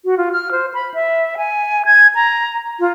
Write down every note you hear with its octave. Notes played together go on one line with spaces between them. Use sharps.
F#4
F4
F6
C5
B5
E5
G#5
G#6
A#5
F4